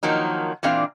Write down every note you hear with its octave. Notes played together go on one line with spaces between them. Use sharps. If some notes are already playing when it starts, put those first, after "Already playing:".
D#3 F3 F#3 A#3 D#4
A#2 E3 C4 D4 F5